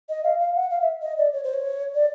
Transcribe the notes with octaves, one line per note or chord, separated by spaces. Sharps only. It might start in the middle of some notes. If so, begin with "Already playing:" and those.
D#5
F5
F5
F#5
F5
E5
D#5
D5
C#5
C5
C#5
D5